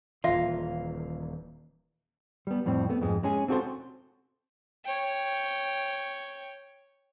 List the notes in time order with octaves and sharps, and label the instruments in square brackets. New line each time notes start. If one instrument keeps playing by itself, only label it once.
[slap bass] D#1 E3 [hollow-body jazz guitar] F4 [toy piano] E5 F5
[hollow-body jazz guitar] G3 B3
F2 A2 G3 C4
A3 B3
F2 G#2 G#3
G#3 C#4 G#4
C4 D4 F#4 G#4 A4 C5
[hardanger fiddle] C#5 G5